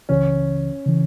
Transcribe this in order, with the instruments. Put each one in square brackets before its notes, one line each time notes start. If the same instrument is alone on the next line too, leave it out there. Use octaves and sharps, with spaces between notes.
[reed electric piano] C#2 C#3 E3 [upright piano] C#4
[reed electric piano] C#3 E3